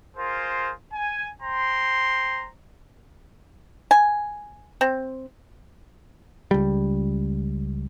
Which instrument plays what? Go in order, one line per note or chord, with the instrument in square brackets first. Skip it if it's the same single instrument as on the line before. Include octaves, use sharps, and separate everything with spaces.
[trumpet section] F4 G#4 A#4 C5
G#5
C5 G5 A#5 C6
[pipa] G#5
C4
[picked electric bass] C#2 G3